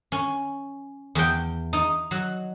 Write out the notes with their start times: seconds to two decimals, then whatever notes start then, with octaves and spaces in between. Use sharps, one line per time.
0.12 C#4
1.15 E2 G5
1.73 D#4
2.11 F#3